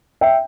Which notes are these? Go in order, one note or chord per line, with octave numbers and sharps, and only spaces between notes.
E5 G5